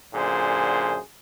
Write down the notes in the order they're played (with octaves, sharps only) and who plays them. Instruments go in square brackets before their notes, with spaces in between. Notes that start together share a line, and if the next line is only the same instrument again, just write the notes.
[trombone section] F#2 A#2 D3 G#4 C5